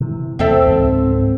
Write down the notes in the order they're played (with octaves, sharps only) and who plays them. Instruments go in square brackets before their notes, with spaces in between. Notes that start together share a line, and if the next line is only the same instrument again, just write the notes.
[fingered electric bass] C3 E3
[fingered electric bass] E2 [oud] C4 A4 E5
[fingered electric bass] C#2 G#2